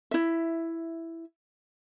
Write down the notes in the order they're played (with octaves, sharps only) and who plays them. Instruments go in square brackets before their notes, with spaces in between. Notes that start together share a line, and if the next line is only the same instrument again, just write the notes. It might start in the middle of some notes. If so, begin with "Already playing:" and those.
[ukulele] E4 E5